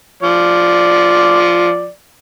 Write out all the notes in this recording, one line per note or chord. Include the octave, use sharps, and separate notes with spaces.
F3 D5